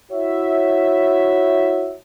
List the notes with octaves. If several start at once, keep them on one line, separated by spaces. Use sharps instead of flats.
E4 F#4 C#5 E5